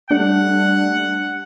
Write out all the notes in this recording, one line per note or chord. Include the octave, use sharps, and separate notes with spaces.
G3 A3 D4 F#5